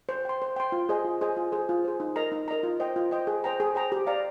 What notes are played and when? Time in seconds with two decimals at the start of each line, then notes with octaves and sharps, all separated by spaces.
0.09 C5
0.25 G5 C6
0.42 C5
0.56 G5 C6
0.72 F4
0.89 G#4 C5 D#5 G#5
1.05 F4
1.21 G#4 C5 D#5 G#5
1.37 F4
1.52 G#4 C5
1.69 F4
1.85 G#4 C5
2.00 D#4
2.16 A#4 D#5 A#5
2.32 D#4
2.48 A#4 D#5 A#5
2.63 F4
2.80 C5 D#5 G5
2.96 F4
3.11 C5 D#5 G5
3.27 G#4
3.44 C5 G5 A#5
3.60 G#4
3.75 C5 G5 A#5
3.92 G4
4.07 D5 F5 A#5